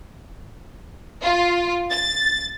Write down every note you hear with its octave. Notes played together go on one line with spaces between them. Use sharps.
F4
A6